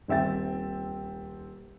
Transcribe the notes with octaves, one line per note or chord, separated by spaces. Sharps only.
D#1 C4 E5 G5 A6